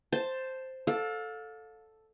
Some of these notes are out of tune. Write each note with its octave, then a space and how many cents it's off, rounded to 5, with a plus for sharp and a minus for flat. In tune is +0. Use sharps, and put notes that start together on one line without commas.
C5 +0 A5 +5
A4 +0 D5 +10 F5 +35